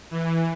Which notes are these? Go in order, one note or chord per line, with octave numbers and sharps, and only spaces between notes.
E3